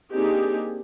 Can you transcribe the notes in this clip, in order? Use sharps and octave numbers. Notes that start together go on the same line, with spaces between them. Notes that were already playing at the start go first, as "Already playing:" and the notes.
A#3 C4 D4 D#4 G4 G#4